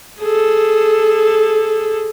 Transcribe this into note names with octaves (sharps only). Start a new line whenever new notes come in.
G#4 A4